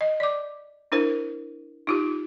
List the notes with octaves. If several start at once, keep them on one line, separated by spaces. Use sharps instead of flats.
D#5
D5 D6
D4 E4 A#4 C5
D#4 F4 G4